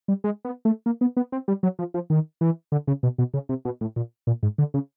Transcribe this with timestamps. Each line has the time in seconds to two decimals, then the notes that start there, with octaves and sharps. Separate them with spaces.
0.08 G3
0.24 G#3
0.45 B3
0.65 A3
0.86 A#3
1.01 B3
1.17 B3
1.32 C4
1.48 G3
1.63 F#3
1.79 F3
1.94 F3
2.10 D#3
2.41 E3
2.72 D3
2.87 C#3
3.03 B2
3.18 B2
3.34 C#3
3.49 C3
3.65 B2
3.81 A2
3.96 A#2
4.27 A#2
4.43 G#2
4.58 D3
4.74 C#3